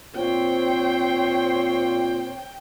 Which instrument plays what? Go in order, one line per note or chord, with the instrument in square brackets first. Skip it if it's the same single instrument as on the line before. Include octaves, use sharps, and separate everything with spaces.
[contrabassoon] A#2 [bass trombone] C4 [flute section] C5 C#5 [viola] G5